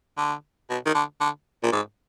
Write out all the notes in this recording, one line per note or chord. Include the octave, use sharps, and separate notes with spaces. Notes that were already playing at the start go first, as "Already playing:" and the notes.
D3
B2
D#3
D3
D3
A#2
G#2